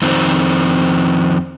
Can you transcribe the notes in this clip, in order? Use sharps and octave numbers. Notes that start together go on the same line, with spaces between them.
F2 D#3 C4